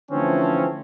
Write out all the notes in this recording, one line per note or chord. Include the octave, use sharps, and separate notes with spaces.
D3 E3 F3 A3 C4 C#4